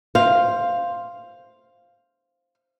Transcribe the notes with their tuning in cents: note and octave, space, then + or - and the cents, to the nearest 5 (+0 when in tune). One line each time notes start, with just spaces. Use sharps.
C5 +5 F5 +0